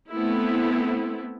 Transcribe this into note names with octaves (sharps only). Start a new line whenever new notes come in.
A3 B3 C4 E4